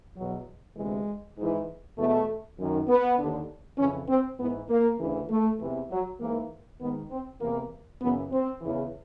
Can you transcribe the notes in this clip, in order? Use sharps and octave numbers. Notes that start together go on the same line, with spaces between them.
E2 B2 F#3
D2 C3 E3 G#3
G#2
E3
E2 B2 A3
F#2 D#3
B3
D#2 D3
F2 C#3 E3 C#4
C4
G#2 E3 B3
A#3
D2 C#3 E3
A3
E2 C3 E3
F#3
G#2 E3 A#3
G#2 D#3 B3
C4
E2 C3 E3 A#3
F#2 C#3 E3 B3
C4
E2 C#3 E3